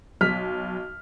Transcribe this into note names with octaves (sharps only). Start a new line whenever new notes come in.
B1 F6 B6